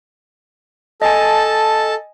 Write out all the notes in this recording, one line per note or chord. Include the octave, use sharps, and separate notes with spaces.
A4 D#5 G#5 A5